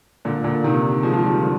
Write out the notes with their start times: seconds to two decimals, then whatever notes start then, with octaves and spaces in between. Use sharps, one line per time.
0.25 A#2 D3
0.44 A#2 D3
0.64 C3 D#3
1.03 F3 G#3
1.13 F3
1.23 D#3 G3
1.34 D#3
1.43 D3 F3